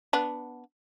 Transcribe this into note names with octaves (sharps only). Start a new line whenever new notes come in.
B3 D4